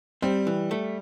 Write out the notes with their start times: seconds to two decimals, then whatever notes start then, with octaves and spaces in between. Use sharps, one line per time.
0.22 G3 C4
0.47 E3
0.71 A3